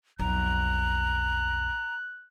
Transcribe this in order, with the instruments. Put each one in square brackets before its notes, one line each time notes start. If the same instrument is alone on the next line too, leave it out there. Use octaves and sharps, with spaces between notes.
[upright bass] B1 F2 [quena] A#5 [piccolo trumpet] F#6